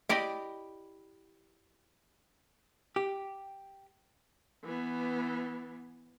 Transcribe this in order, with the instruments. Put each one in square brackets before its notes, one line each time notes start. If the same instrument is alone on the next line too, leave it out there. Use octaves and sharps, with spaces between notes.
[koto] E4 G4 D5 D#5
[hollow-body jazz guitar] G4
[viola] E3 B3